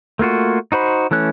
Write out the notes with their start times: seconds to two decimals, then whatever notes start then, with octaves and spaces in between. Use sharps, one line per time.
0.19 A3 A#3 F4 F#4
0.72 D#4 F#4 C5 B5
1.11 E3 A3 C#4 F#6